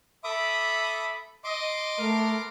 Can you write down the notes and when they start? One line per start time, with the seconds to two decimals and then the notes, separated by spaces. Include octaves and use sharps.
0.24 A4 E5 B5 D6 D#6
1.44 D#5 C6 D6
1.98 A3 B3 A#4